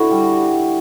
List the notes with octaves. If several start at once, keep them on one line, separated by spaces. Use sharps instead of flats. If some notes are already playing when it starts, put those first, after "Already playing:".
Already playing: D3 E4 F#4
G3